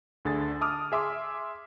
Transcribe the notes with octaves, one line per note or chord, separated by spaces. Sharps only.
D2 D3 G#4 A6
A5 D6 D#6 F6
G#4 E5 C6 D6